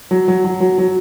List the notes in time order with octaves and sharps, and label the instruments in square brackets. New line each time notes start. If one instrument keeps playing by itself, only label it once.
[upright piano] F#3
F#3
F#3
F#3
F#3